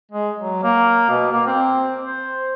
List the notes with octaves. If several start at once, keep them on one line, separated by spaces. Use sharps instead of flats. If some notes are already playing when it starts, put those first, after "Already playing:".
G#3
F#3
A#3
B2
A#3
C4
C5